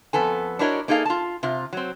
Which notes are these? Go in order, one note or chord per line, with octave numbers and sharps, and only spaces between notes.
F2 B3 A4 G#5
D4 E4 F#4 A#4 C#5 D#5
A#3 D#4 G#4 A4 F5
F4 A5
C3 F4
F#3 C4